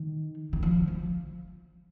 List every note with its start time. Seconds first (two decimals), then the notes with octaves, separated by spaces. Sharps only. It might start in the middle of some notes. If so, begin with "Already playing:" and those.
Already playing: D#3
0.53 D#3
0.63 F3
0.88 F3